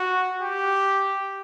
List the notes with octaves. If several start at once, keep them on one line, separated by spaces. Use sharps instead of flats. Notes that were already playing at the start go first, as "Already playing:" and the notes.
Already playing: F#4
G4